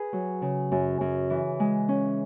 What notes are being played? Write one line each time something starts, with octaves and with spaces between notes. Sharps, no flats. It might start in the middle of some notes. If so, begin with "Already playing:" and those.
Already playing: G#4 B4
F#3
C#3
F#2
F#2
E3
G#3
C#4